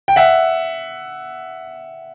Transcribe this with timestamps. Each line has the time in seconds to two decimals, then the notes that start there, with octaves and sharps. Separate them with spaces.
0.08 G5
0.16 E5 F#5